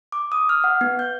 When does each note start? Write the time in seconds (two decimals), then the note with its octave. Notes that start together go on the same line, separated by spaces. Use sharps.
0.12 D6
0.32 D#6
0.49 F6
0.64 F#5
0.81 B3
0.99 G6